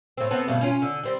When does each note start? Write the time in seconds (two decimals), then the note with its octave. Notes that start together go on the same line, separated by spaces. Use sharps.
0.17 A2 C4
0.31 B3 C4 A4
0.47 D2 G2 B2
0.61 C#4 F4
0.82 D3
1.04 G3 C4